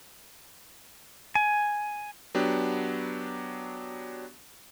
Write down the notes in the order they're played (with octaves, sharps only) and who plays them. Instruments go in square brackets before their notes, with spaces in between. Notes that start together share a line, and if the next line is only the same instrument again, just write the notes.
[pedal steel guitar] G#5
[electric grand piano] F#3 B3 D4 G4